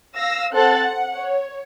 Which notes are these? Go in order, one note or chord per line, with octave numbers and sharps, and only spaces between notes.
F5 E6 A#6
C4 A4 C5 F#5 F#6 A6
F#5
C#5